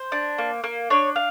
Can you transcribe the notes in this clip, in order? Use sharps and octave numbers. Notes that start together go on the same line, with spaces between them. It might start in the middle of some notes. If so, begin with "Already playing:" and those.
Already playing: C5
D4
A#3
A#3
D4 C#5
F5